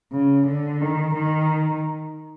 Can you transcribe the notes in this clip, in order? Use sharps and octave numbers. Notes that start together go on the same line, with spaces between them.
C#3
D3
D#3
D#3